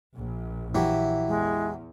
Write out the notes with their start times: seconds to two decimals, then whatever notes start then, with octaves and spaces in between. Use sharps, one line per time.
0.14 A#1
0.75 E3 F#3 E4 G4
1.28 E2 G#3